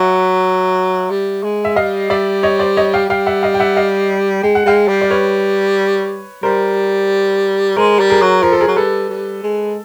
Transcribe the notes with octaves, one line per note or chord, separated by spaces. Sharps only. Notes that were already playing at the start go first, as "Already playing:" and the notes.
Already playing: F#3 E5 F#5
G3
G#3
E5
G3 D#5 F5
G3 D5 E5
C#5 D#5
C5 D5
C#5 D#5
F5 G5
G3 F5 G5
E5 F#5
D#5 F5
G5
E5 F#5
D#5 F5
G#3 G5
F#5
G#3 F5 G5
G3
D5
B4 C#5
G3 A#4 C5
G#3 A#4 C5
G3
G#4 A#4
F#3
F3 A#4
A4
G#4 A#4
F#3
G3 A4 B4
G3
G#3